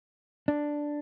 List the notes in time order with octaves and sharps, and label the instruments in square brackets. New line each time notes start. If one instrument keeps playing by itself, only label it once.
[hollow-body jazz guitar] D4